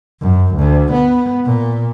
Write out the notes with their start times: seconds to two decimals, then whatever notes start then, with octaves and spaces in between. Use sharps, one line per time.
0.21 F#2
0.55 D2
0.93 B3
1.45 A#2